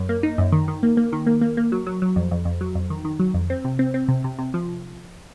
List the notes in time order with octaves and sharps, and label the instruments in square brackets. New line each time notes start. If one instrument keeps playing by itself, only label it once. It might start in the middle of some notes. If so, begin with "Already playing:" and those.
Already playing: [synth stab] F#2
A#3
D#4
F#2
D#3
D#3
A#3
A#3
D#3
A#3
A#3
A#3
F#3
F#3
F#3
F2
F2
F2
F#3
F2
D#3
D#3
F#3
F2
C4
C3
C4
C4
C3
C3
C3
F3